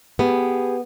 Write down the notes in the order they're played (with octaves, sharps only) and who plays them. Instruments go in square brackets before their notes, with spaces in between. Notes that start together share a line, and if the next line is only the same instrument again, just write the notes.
[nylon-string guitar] B3 [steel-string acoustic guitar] G4 G#4